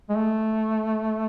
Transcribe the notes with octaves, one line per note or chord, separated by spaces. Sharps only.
G#3
A3